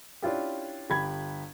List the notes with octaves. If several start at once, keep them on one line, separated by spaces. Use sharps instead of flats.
C#4 D4 E4 F4 G4
G1 G4 B5 G#6